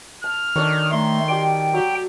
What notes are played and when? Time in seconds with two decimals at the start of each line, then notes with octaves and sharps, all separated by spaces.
0.24 A5 F6
0.56 D#3 D4 A4 C#5
0.92 A3 D#5 C6
1.28 G4 D5 G5
1.73 F#3 G4